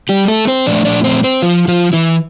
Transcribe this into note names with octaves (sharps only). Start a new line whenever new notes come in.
G3 G4
A3 A4
C4 C5
A#2 F3 A3 D4 D5
D4 D5
C4 C5
C4 C5
F3 F4
F3 F4
E3 E4